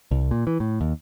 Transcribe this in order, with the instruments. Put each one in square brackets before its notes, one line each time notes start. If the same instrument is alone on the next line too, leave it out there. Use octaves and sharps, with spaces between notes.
[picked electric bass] C2
A#2
E3
A2
D#2